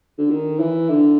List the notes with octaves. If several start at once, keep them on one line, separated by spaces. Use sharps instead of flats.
D3
D#3
E3
D3